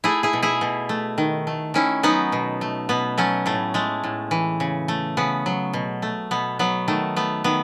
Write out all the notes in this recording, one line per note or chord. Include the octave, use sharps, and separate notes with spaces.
A3 E4 G#4
E4 G#4
B2
E4 G#4
B2
A3
D#3
A3
D#3 C#4 E4
F#3 B3 D#4
B2
A3
B2 B3
F#3 A3 C#4
A2 A3
G#3 A3
A2
E3
C#3
A3
C#3 B3
F#3
B2
A3
B2 B3
F#3 B3
D#3 A3
A3 B3
D#3 B3